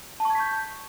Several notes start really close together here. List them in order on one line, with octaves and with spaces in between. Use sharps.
A5 C#6 G#6 B6 G6